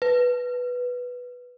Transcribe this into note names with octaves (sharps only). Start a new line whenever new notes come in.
B4